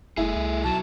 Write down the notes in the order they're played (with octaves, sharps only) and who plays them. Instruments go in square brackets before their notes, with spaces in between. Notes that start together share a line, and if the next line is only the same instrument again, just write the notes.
[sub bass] F#1 [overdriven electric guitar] A3 G#4 [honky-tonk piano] E4
[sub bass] C2
[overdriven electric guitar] B1 F#3 [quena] A5